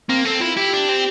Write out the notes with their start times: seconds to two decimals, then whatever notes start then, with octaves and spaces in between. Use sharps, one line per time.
0.09 A#3 C4
0.25 C4 A4
0.41 E4 F4
0.57 E4 G4
0.73 D4
0.89 C4